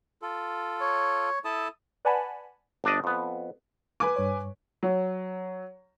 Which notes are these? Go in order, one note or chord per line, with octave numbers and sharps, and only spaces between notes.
F4 A4
C#5
E4 A4 A5 D#6
B4 D5 F#5 G#5 A5 B5
G1 D4 D5 D#5
F2 B3
B4 G#5 D6
G2 C#5
F#3